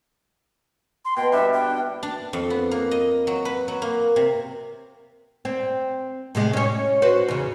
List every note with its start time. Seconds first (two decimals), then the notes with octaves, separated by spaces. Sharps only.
1.05 C6
1.17 B2 G5
1.32 G3 D4 E5
1.53 G5
2.03 D4
2.33 F2
2.50 B3
2.71 A#3
2.91 D#5
3.27 F#3
3.45 B4
3.68 F#3
3.82 A#3
4.16 C3
5.45 C4
6.35 A2 C3 G#3
6.53 C#4 C#5
7.02 F#4 B4 C5
7.28 E2 C#3